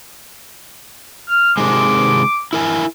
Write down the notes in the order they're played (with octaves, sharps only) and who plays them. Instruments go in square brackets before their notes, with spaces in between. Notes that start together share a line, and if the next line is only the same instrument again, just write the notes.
[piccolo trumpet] F6
[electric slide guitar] C3 D#3 G#3 [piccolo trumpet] D6
[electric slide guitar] E4 A#4 G#5